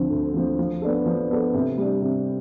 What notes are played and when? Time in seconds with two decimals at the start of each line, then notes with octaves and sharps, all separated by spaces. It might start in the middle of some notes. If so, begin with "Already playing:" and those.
Already playing: D2 D3 F3 C4
0.10 D2
0.34 D3 F3 C4
0.59 F3
0.82 B3 D4 A4
1.06 F3
1.30 B3 D4 A4
1.54 C3
1.78 G3 D4
2.02 C3